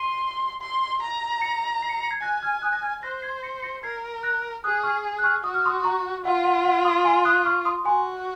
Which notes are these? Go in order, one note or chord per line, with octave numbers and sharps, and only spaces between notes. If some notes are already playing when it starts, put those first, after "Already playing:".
Already playing: C6 C7 D#7
C6
A#5
A#6 C#7
C7
C#7
C7
C#7
G#6 C7
G#5 F#6 A#6
F6 G#6
D#6 F#6
A#6
F6 G#6
C5 F#6 A#6
G#6 C7
A#6 C#7
A#6 C#7
A#4 G#6 C7
F#6 A#6
G#4 D#6 F#6
C#6 F6
F#6
C#6 F6
F#4 D#6
F6
C6 D#6
A#5 C#6
F4 F#5
F#5
F#5
C6 D#6
G#5 C6
D#6 F#6
C#6 F6
C6 D#6
F#4 G#5 C6